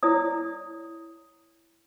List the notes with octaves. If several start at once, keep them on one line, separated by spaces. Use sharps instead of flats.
E4 C#5 D5 D#6